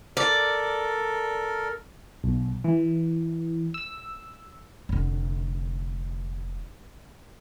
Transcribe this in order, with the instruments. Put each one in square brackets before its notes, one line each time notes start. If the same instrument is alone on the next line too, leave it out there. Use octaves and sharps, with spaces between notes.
[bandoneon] A4 A#4 [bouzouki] D5
[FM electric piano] B1
E3
E6
[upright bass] F1 D3